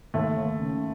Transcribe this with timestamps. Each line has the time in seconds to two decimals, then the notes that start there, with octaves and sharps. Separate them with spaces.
0.14 D#2 A3
0.37 D#2
0.59 C#3